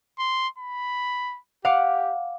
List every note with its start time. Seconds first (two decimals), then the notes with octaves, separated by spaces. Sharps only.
0.19 C6
0.59 B5
1.65 G4 F5 F#5 D6